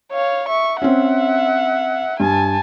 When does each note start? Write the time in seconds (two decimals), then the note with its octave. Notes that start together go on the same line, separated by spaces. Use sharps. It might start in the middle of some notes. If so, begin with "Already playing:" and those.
0.12 C#5 F5
0.49 E5 C#6
0.82 C4 C#4 E5 F#5
2.20 G2 G#5 A5